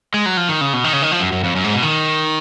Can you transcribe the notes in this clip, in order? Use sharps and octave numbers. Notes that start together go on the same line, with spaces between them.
G#3
F#3
F3
D#3
C#3
B2
D#3
C#3
D#3
F3
F#2
F#2
F2
F#2
G#2
B2
D#3